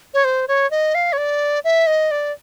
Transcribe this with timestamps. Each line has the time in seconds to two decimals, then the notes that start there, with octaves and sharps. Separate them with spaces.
0.14 C#5
0.24 C5
0.48 C#5
0.71 D#5
0.95 F5
1.13 C#5
1.18 D5
1.64 E5
1.87 D#5
2.11 D5